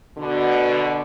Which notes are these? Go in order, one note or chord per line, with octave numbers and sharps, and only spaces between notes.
B2 D3